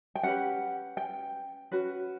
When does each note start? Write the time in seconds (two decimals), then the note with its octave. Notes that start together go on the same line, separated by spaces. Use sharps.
0.15 G5
0.23 C#4 G4 B4 F#5
0.97 G5
1.72 C#4 F#4 B4